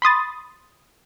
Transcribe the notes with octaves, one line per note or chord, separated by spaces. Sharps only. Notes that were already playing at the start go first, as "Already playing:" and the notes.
B5 C6 D#6 A6